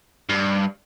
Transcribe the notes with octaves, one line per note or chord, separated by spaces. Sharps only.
G2